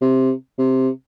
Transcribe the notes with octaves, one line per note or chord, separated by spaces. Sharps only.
C3
C3